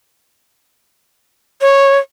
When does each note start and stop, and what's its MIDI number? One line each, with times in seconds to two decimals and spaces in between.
1.61 1.98 73